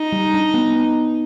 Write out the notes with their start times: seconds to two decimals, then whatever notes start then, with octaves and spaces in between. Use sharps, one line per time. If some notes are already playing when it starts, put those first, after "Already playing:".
Already playing: D#4
0.12 G3
0.34 D4
0.54 B3
0.75 B3